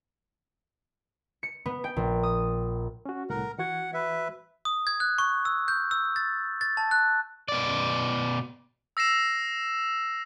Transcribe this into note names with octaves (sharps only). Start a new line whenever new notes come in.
C#7
B3
G5
A#1
D#6
C#4 F#4
C2 A2 A#4 F#5
E3 F#4 F#5 G#6
B4 E5
D#6
G#6
F#6
C#6
E6
G6
E6
A6
A6
A5
F#6
B2 D5
E6 A#6 C7 E7